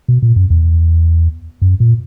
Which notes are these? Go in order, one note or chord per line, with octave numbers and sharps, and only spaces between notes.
B2
A#2
F#2
E2
F#2
A#2